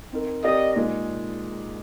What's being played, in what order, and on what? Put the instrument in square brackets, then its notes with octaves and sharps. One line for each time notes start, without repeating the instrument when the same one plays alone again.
[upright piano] C4 D#4 A#4
[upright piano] C4 G4 A#4 D5 F5 [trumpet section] D#5
[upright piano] A#2 G#3 D#4 G#4